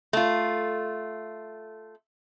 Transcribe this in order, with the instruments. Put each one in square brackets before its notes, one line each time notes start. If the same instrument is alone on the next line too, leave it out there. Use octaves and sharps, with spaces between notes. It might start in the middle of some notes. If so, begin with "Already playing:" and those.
[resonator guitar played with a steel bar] A3 F4